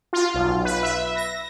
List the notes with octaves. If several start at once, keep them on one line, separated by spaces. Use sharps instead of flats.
F4
B1
B4
E5
A#6